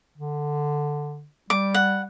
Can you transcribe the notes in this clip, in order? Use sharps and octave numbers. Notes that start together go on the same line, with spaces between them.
D3
G3 D6
F#5